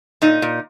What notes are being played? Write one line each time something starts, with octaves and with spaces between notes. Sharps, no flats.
A#2 D#4
A#2